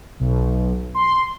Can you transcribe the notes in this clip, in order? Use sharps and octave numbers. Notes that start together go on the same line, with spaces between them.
B1
C6